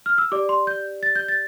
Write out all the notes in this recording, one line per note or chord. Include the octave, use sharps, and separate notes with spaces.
F6
E6
G4 D5 D6
C6
G6
A6
G6
A6